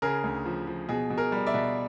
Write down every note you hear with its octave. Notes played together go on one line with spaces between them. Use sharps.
C#3 G#4 A#4
D2
F3
F3
B2 G#4
B2
G#4 A#4
G3
D5 E5
B2